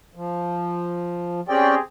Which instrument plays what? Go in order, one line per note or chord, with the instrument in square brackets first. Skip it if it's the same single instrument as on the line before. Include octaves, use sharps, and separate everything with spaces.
[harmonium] F3
[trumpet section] C4 G4 G#4 [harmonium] C#4 D5 G5